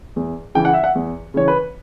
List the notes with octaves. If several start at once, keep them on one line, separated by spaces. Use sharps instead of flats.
E2
C#3 E3 G5
F#5
E5
F#5
E2
C#3 E3 C#5
B4